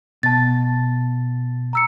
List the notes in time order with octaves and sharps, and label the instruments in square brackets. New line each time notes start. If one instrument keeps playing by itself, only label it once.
[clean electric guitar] B2 [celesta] A5 A6
[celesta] A#5 E6 C#7